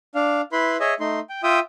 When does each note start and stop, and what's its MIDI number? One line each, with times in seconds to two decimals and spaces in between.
0.15 0.41 62
0.15 0.41 77
0.52 0.77 64
0.52 0.77 71
0.52 0.77 83
0.52 0.77 84
0.80 0.94 68
0.80 0.94 73
0.80 0.94 75
0.80 0.94 76
1.00 1.20 57
1.00 1.20 63
1.00 1.20 84
1.29 1.43 79
1.43 1.60 65
1.43 1.60 76
1.43 1.60 79
1.43 1.60 87